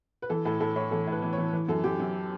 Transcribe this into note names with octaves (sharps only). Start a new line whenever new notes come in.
B4
E3 A4
A2 A4
A2 A4
A2 C#5
E3 A4
A2 B4
E3
C#5
E3
E3
F#2 A4
F#2 G4
F#2